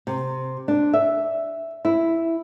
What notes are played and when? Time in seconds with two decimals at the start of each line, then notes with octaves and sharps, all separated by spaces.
0.07 C3
0.68 D4
0.94 E5
1.85 E4